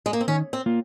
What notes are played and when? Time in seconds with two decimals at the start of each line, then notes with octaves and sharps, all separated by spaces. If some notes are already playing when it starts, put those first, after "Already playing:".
0.06 G#3
0.13 A#3
0.21 C4
0.28 D#3 C#4
0.53 C4
0.66 A#3 F4